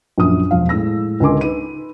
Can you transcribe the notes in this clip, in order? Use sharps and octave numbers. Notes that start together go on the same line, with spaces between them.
A#1 F#2 D#6
E1 F3 F5
A2 G#3 E6 A#6
C#2 D3 A#4 G#5 C6 D6
D#4 B4 D#7